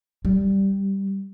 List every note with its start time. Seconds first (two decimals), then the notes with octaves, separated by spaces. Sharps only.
0.25 G3